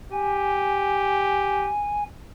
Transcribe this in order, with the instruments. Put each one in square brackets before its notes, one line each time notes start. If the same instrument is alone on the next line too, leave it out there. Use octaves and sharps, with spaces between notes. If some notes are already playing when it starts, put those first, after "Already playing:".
[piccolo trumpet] G4 [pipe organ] G#5